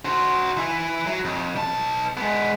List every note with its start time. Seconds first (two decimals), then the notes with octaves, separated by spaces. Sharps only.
0.05 F#4 C5
0.57 E3 E4
1.06 F#3
1.25 F2
1.56 B1 A5
2.17 G#3 B3